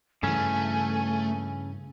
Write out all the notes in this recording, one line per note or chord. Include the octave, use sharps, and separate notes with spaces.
G2 C#3 E3 A3 C#4 G#5